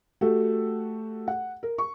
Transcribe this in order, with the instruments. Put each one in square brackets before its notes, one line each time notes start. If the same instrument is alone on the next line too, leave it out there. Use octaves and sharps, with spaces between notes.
[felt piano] A3 F#4 G4 A4
F#5
A#4
C#6